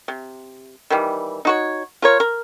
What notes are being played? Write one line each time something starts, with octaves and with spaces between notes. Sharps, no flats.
C3
D#3 E3 G3
D#4 F#4 C#5
F4 A#4 C#5
A#4